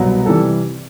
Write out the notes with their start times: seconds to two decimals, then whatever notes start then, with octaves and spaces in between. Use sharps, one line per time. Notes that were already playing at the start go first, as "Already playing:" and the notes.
Already playing: C2 B2 F#3
0.26 C3 E3 G3 A4